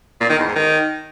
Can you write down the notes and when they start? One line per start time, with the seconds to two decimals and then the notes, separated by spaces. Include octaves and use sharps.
0.21 A#2
0.29 D#3
0.38 E2
0.47 G#2
0.56 D#3